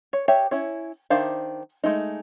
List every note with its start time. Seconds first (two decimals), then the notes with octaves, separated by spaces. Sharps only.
0.13 C#5
0.28 G4 C#5 E5
0.51 C#4 E4 C#5
1.10 D#3 D4 C5 E5 F5
1.84 G#3 A3 D#4